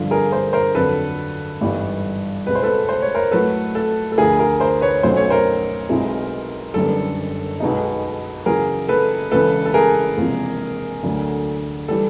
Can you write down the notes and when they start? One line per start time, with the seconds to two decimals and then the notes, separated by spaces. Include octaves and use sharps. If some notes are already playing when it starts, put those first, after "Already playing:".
Already playing: G1 G2 D3 F3
0.11 G#4 A#4
0.32 A#4 C5
0.53 A#4 C5
0.74 F2 D3 F#3 A4 B4
1.61 G#1 G2 E3 G3 B3
2.46 C#2 B2 G#3 B4
2.55 C5
2.63 A4 B4
2.89 C5
3.02 C#5
3.15 A#4 C5
3.31 A2 F#3 A3 A4 B4
3.75 A4
4.12 A4
4.18 D2 D3 F3 G#4 A#4
4.39 G#4 A#4
4.60 A#4 C5
4.81 B4 C#5
5.03 B1 B2 F#3 A3 C#4 C5
5.17 C#5
5.30 A#4 C5
5.89 B1 B2 G#3 C4 E4
6.74 F#1 F#2 D3 G3 B3 A4
7.60 B1 B2 G#3 B3 D#4
8.46 E2 C#3 F#3 G#4 A#4
8.89 A4 B4
9.32 E1 E2 C#3 E3 A4 B4
9.65 A4
9.74 G#4 A#4
10.17 E1 E2 C3 F3 A#3
11.03 D2 D3 F#3
11.88 E3 G3 A4